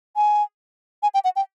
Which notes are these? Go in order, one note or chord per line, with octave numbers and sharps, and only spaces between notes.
G#5
G#5
G5
F#5
G5